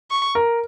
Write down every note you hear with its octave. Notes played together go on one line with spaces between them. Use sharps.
C#6
A#4